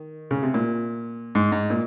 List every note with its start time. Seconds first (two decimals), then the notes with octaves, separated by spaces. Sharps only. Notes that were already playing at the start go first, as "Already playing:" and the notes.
Already playing: D#3
0.31 C#3
0.43 C3
0.54 A#2
1.35 G#2
1.52 G#2
1.70 A#2